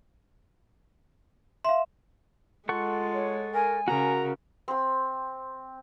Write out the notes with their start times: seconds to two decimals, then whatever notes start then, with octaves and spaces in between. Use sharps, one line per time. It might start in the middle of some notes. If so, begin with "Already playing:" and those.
1.65 E5 F5 C6
2.69 G#3 F4 A4 F#5 C#6
3.13 C#5
3.54 A#4 G#5
3.88 C#3 F#4 A#4 A#5
4.68 C4 C6